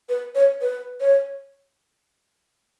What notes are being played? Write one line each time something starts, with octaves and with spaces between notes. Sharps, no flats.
B4
C#5
B4
C#5